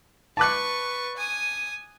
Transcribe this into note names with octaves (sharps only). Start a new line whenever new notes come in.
B4 A5 C#6 D6 F#6
G#5 D#6